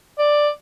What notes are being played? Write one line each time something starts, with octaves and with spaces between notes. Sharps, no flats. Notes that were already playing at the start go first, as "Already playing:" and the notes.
D5